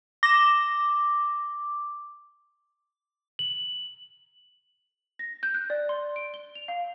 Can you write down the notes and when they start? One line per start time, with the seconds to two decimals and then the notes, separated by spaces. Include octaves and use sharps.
0.23 D6 A#6 E7
3.39 F#7
5.19 A#6
5.43 G6
5.54 F#6
5.70 D5
5.89 C6
6.16 D7
6.34 G7
6.55 F7
6.68 F5